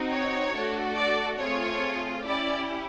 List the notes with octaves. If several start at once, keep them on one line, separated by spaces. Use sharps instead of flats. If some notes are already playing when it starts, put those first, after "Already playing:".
Already playing: C4 D#4 F#4
C#5
A3 D4 F#4 A4
D5
A3 C4 F4 G#4 C#5
C#4 E4 G4 D5